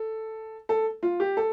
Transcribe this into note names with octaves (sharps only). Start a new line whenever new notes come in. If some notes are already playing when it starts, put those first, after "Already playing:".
Already playing: A4
A4
F4
G4
A4